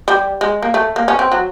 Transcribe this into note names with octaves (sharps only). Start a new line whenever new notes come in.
G3
G#3
A#3
A3
A#3
C#4
C4
F#3